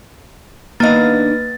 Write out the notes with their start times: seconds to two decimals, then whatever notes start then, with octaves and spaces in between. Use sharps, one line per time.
0.80 D#3 A#3 B3 D4 D#5 F5 A6